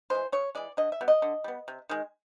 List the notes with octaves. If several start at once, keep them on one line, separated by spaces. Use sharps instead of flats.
E3 G#3 C5
C#3 C#5
E3 G#3 D5
D3 D#5
E5
G3 B3
D#5
D3
G3 B3
C3
D#3 G#3